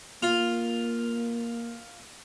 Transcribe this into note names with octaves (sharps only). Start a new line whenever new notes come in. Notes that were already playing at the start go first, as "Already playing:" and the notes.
A#3 F4